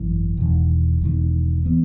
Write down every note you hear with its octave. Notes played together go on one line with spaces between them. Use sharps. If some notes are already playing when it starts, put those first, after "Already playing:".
Already playing: G#1 F#2 E3
E1 E2 D#3
E1 E2 D#3
E3 B3